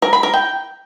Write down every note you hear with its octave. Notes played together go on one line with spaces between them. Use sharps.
A#4
B5
A#4
G5